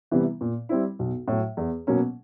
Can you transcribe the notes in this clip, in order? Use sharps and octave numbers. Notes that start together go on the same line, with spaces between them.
C3 E3 G3 B3
A#2
G3 C4 E4
B1
A2 F#3
E2
B2 F#3 A#3 C#4